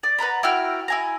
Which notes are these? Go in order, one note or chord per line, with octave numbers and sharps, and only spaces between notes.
D5
B4 F#5 A#5 B5
E4 F#4 G5 F6
E4 G#5 A#5